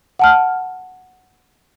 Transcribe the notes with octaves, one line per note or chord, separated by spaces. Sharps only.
F#5 A5 F6